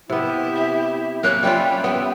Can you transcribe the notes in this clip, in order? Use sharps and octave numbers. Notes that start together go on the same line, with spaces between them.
C3 B3 E4 G4
E5
A#3 C#4 F#6
G3 C#4 F4 G4 E5 G5 B5
B3 G5